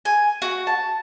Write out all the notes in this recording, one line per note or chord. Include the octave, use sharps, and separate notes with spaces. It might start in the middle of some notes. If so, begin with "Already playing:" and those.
G#5
F#4
A5